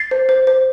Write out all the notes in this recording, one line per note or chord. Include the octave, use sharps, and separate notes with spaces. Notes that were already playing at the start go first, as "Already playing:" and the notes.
Already playing: A6 C7
C5
C5
C5